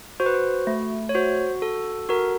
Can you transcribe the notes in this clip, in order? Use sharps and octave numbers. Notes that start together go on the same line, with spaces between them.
F#4 C5
B4
C5
A3
C#5
F#4 C5
A4
F#4 A#4